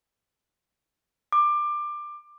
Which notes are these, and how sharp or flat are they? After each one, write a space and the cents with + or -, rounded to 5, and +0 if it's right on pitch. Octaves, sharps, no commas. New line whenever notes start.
D6 +20